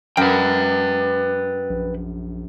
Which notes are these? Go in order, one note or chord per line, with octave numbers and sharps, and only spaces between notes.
F#2 B4 G5
A#1